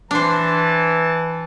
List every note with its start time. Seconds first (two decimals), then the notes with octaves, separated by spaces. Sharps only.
0.11 E3 D4 C5 A5